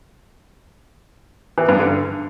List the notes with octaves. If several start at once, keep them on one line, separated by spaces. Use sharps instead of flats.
E3
G2
D3